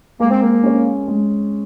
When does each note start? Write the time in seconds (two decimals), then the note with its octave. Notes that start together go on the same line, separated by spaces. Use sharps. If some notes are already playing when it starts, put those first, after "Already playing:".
0.20 G#3 A#3
0.31 C4
0.42 A#3
0.63 C#4 G#4 C#5
1.08 G#3